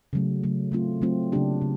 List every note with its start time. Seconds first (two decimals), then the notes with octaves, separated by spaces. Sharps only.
0.13 C#3 F#3 A3
0.43 C#3 F#3 A3
0.72 F#3 A3 C4 F4
1.02 F#3 A3 C4 F4
1.32 C#3 F#3 A#3 D4 G4
1.61 C#3